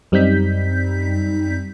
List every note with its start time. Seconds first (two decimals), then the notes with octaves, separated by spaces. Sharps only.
0.12 F#2 G3 C4 D#4 G6 B6